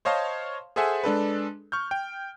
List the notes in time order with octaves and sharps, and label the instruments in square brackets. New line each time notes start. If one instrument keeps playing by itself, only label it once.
[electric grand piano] C5 C#5 D#5 F5 A5 C6
G#4 A4 C5 E5 F#5 G#5
G#3 D4 A4 B4
C#6 F6 G6
G5